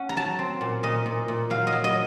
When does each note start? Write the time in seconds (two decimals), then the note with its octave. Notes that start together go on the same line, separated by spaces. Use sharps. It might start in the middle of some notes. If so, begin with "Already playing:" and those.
Already playing: C#4 F#5
0.09 A#5
0.16 F#3 A5
0.39 C4
0.61 A#2
0.83 A#2 D#5
1.06 A#2
1.28 A#2
1.50 F#3 F5
1.67 D#5
1.73 F#3
1.84 D#5